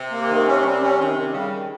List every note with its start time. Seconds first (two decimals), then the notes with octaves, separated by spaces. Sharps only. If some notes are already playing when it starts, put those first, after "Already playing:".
Already playing: C3
0.11 A#3
0.29 D#3
0.46 C#4
0.64 G3
0.81 C#4
0.98 C3 D#3
1.16 D#3
1.33 C#3 G3
1.50 D#3